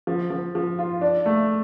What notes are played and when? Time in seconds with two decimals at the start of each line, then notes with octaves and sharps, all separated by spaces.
0.07 F3
0.30 F3
0.55 F3
0.79 F4
1.01 D4
1.26 A3